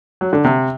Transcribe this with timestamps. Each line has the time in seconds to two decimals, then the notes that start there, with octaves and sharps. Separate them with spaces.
0.21 F#3
0.33 D3
0.44 C3